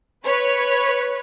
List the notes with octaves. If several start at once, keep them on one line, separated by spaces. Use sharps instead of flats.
B4 C#5